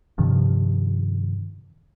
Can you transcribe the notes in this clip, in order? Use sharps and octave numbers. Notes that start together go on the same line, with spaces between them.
G2 C3 D#3 F3